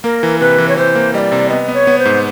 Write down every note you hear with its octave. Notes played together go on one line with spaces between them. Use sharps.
A#3 A#4
E3
C3 B4
E3
C#5
E3 C5
A#3
G3 D5 D#5
C3
B3 D#5
B3
C#5
B3
C5
G#2